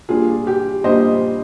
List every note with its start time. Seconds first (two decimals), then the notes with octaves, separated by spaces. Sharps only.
0.09 A#2 G3 D4 F4 G#4
0.47 G4
0.84 A#2 G3 D4 C5 D#5